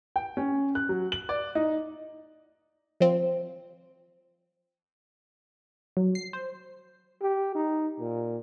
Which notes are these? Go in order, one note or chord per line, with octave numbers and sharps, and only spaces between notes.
G5
C#4
F#6
F#3
F#7
D5
D#4
F3 C4
F#3
C7
C5
G4
D#4
A#2